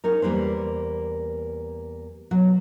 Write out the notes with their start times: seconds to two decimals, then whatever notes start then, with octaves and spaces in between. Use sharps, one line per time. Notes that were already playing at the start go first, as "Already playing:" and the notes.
0.04 C#4 D#4 A#4
0.22 E2 G3 A#3 B4 C5
2.31 B2 F#3